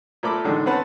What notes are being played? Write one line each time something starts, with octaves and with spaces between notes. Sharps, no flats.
A#2 A3 A4 A#4 B5 D6
E2 A2 D3 D#3 G#3
C4 C#4 B4 F#5 A5